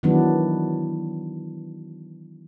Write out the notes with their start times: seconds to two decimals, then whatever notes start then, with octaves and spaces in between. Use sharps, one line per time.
0.03 D#3 E3 F#3 B3 D4